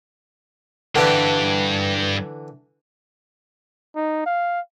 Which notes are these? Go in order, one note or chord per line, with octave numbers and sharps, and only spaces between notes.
G2 D3 E3 G4
D#4
F5